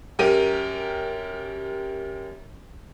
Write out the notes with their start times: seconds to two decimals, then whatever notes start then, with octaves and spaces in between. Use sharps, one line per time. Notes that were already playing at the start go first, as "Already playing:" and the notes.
0.19 F#2 G4 A#4 D#7